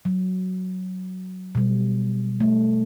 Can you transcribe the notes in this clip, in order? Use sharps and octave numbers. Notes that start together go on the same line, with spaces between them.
F#3
B2 G3
A3